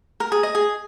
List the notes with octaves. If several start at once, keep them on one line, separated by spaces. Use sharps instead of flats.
A#4
G#4
D#5
G#4